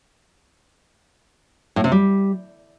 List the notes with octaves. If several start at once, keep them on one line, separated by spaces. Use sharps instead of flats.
A2
C3
G3